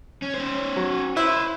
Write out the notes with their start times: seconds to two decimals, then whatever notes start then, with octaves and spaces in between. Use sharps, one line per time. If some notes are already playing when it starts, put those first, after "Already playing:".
0.22 C#4
0.34 C#4 C5
0.77 F#3
1.17 E4 B4 C5